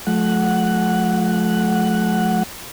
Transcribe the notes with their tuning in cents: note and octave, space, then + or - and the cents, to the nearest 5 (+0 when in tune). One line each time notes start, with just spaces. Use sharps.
F3 +40 A3 -30 F#5 +0